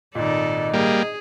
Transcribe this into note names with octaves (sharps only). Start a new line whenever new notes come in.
G#1 A#2 D#4 A4 D5 D#5
G3 A#3 G#4